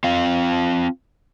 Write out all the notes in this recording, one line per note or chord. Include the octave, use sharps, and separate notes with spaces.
C4 F4 F5